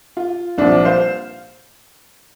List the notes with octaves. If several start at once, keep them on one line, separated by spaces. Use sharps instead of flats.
F4
C2 A#2 F3 D4
C5 F5